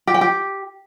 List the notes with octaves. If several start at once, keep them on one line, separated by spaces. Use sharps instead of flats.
G4
G5
G4